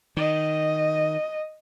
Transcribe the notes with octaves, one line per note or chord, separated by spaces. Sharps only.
D#3 D#5